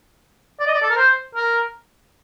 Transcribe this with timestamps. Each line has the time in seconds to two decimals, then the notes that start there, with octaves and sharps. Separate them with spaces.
0.59 D5
0.67 D#5
0.74 D5
0.82 A4
0.90 A#4
0.97 C5
1.35 A#4